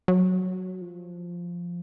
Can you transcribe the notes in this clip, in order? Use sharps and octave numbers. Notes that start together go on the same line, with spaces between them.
F#3
F3